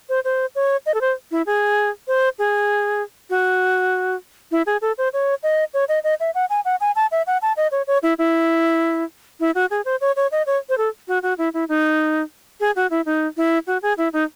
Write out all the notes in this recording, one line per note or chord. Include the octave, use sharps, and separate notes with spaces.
C5
C5
C#5
D#5
A4
C5
E4
G#4
C5
G#4
F#4
E4
G#4
A4
C5
C#5
D#5
C#5
D#5
D#5
E5
F#5
G#5
F#5
G#5
A5
E5
F#5
A5
D#5
C#5
C#5
E4
E4
E4
F#4
G#4
C5
C#5
C#5
D#5
C#5
C5
A4
F#4
F#4
E4
E4
D#4
G#4
F#4
E4
D#4
E4
F#4
G#4
E4
D#4